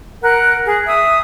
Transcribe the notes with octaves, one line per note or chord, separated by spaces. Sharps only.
A#4 F#5 F#6
G#4
E5 D#6